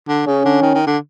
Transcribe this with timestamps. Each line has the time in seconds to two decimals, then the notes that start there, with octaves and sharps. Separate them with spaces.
0.08 D3
0.26 C#3 C#4
0.45 D3
0.62 D#3
0.75 D#3
0.87 D3